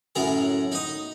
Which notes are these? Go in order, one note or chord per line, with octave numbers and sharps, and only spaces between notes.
F#2 A2 G#4 A#5
D#4 D#5